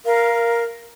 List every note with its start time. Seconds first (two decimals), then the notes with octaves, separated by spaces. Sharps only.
0.05 A#4 F5